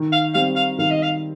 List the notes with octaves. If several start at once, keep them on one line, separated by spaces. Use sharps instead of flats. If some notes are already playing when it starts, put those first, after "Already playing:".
Already playing: D#3
F5
G3 C4 F5
F5
D#3 F5
D#5
F5